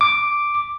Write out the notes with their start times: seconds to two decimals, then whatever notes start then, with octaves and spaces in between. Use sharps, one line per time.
0.01 D6